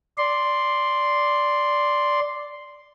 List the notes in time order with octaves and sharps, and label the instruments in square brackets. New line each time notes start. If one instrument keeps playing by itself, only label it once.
[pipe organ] D5 C6